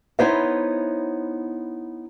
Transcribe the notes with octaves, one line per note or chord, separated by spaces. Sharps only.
B3 D#4 E4 C5 C#5 E5